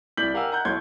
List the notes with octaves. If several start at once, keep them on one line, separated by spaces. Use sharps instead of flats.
C2 E4 D5 G6 B6 F#7
G4 A#4 F5 F#5 G#5 E6
D#5 F#5 A#5 F#6 G6
B1 E4 C#5 C6 G6 G#6